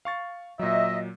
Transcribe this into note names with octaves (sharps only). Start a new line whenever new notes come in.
F5 C#6 A6
A#2 F#3 D#5 E5